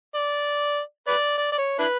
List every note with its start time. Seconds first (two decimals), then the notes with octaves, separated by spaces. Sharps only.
0.15 D5
1.07 B4 D5
1.37 D5
1.52 D5
1.58 C#5
1.79 D4 E4 B4